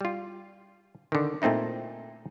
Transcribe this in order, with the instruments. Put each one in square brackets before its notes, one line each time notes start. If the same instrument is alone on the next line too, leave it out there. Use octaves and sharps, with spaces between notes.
[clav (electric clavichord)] G3 F4
D3 D#3
A#2 A3 C4 D#4 E4